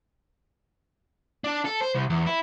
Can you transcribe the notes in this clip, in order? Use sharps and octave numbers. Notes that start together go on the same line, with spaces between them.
D4
A4
C5
C2
E2
E4